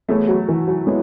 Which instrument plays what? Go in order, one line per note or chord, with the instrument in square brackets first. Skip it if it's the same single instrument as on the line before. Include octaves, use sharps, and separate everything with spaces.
[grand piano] E3 B3 E4 G#4 C#5 [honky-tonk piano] A3
[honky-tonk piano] F#3
E3
F#3
[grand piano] E3 B3 G#4 C#5 [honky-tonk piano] G#3